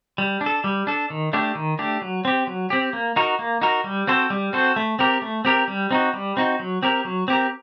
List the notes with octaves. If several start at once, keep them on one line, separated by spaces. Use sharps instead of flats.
G3
D4
A4
G3
D4 A4
D#3
A3 D4 G4
D#3
A3 D4 G4
F#3
C4 G4
F#3
C4 G4
A#3
D#4 F#4 A#4
A#3
D#4 F#4 A#4
G3
C4 F#4 A4 C5
G3
C4 F#4 A4 C5
A3
C4 G4 A#4
A3
C4 G4 A#4
G3
C4 D#4 F#4
G3
C4 D#4 F#4
F#3
C4 G4 A#4
F#3
C4 G4 A#4